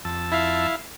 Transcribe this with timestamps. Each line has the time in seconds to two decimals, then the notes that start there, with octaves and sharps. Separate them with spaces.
0.05 F2 A5 E6
0.32 E4 E5 F5